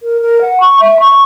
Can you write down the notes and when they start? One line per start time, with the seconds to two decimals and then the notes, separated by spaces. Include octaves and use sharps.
0.02 A#4
0.21 A#4
0.41 F#5
0.60 C#6
0.80 E5
1.00 C#6